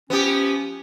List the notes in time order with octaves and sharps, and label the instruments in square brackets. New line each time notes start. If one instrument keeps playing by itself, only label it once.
[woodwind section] F3 C#4 [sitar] B3 G4